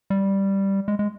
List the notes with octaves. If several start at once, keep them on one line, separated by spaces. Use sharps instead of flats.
G3
G#3
G#3